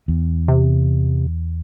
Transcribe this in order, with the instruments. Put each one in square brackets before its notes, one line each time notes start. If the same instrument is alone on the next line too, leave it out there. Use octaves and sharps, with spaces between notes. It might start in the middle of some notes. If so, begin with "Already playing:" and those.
[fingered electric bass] E2
[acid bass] C3